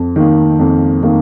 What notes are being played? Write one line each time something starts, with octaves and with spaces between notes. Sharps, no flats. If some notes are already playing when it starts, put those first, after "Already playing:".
Already playing: F2
D#3 A#3
F2
D#3 A#3